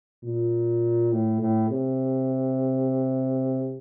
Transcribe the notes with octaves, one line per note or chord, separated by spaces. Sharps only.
A#2
A2
A2
C3